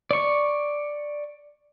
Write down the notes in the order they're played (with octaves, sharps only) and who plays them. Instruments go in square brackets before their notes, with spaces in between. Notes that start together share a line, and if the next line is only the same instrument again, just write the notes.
[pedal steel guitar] D5 C#6